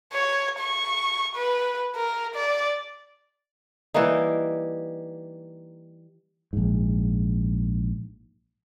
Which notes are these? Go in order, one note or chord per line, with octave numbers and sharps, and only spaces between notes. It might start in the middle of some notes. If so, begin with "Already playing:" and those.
C#5
C#6
B4
A#4
D5
E3 G3 A#3 D#4
A#1 G#2